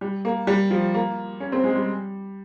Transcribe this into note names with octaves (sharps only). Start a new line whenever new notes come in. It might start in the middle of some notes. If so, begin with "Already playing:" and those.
G3
A#3
G3
F3
A#3
C#4
C4
G#3
G3